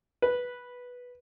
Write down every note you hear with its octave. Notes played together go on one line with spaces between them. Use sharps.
B4